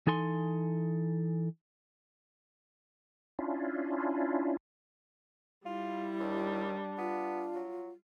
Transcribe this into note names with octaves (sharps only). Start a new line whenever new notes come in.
E3 D#4 A4 G#5 C6
C#4 D4 E4 F4
G3 E4 F4
D#2 D4
B3 F4
F#3